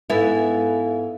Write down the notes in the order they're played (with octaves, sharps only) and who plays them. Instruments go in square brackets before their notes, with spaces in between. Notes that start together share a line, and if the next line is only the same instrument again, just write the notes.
[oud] G#2 B3 E4 [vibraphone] A4 F5 G#5